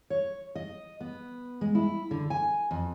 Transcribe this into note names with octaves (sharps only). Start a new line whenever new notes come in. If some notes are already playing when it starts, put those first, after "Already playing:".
C#5
D#5
B3
G#3
E4
D3
G#5
F2